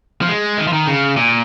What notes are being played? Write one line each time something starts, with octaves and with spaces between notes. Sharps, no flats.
F3
G#3
D#3
F3
D#3
C#3
A#2